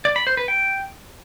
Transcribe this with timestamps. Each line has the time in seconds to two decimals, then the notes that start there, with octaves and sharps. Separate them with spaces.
0.05 D5
0.16 B5
0.27 C5
0.37 B4
0.48 G5